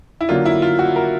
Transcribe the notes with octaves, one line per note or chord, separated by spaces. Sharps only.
E4
D3 F#3 A#3 D4 F4
E4
F4
F#4
A#4